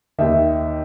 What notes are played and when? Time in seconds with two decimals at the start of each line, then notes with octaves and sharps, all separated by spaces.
0.18 D#2 D#3 E5